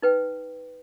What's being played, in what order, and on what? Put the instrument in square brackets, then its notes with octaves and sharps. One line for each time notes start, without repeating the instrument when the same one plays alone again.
[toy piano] D#4 B4 G5